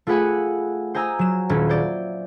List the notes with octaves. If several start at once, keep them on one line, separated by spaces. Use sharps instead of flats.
A3 F4 G#4 B4 F#5 G#5
C5 D#5 G#5 A#5 E6
F#3 E7
D#1 C#4 E5
C5 D5